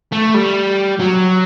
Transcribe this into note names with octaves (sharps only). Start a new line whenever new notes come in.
A3
G3
F#3